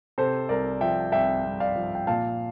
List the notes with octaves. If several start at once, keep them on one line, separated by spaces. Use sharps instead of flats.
C3 A4 C5
C2 A#4 D5
F3 E5 G5
C2 E5 G5
C2
D5 F5
F3
G5
A#2 F5 A5